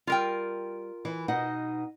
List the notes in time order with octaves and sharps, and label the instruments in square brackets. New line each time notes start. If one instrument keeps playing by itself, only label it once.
[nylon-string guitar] G3 [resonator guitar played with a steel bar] F4 A#4 G5
[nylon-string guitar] E3
B2 D#4 F#5